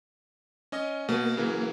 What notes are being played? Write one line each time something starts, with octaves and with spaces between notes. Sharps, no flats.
C#4 D#5 D#6
B2 A#3
C#3 E3 F#3